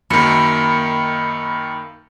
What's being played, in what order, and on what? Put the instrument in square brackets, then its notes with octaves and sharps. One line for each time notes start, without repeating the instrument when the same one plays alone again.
[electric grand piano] F#2 D#3 [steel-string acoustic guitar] A#3 [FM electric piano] B5 C#7